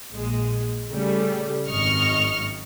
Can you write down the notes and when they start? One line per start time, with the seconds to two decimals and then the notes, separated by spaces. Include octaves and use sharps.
0.11 A#1 G#3
0.90 C#3 G3 A3
1.68 G#1 F#2 D#5 C#6 F6